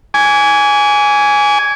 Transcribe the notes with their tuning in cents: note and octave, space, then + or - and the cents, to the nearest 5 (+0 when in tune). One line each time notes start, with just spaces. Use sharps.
G#5 +0 D6 -40